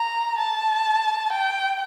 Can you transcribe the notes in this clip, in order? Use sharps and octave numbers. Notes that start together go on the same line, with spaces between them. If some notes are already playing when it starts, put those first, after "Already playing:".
Already playing: A#5
A5
G5